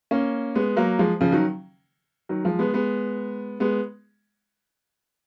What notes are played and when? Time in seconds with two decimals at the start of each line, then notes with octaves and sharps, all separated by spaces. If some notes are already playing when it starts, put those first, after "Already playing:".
0.11 A#3 C#4
0.55 G#3 B3
0.76 F#3 A#3
0.99 F3 G#3
1.21 C#3 F3
1.32 D#3 F#3
2.29 D#3 F#3
2.44 F3 G#3
2.59 G#3 B3
2.74 G#3 B3
3.60 G#3 B3